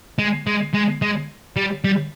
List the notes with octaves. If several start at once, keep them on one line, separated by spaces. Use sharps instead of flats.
G#3
G#3
G#3
G#3
G3
G3